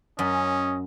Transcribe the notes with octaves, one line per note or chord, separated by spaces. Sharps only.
F#2 C#4 D#5